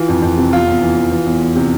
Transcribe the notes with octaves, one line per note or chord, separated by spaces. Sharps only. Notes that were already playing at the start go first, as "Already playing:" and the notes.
Already playing: E3 F4
F2
F2
C3
E2 F4
E2
E3
E3
E3
E2
E2
C3